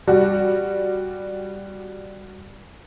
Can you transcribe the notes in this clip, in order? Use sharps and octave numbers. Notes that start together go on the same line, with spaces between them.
G3 F#4 G4